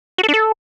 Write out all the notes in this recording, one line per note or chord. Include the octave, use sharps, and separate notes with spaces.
F#4
A4
D4
A4